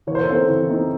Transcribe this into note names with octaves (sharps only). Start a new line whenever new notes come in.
E3 C#5
C5
A4
C4 D#4 C5
E3
C4 D#4